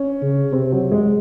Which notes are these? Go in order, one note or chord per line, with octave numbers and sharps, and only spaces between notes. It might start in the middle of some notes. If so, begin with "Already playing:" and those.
Already playing: C#4
C#3
C3 C4
F#3
G#3